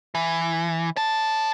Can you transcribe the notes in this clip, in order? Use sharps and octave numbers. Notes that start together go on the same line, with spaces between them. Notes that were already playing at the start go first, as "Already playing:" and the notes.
E3
C#5 A5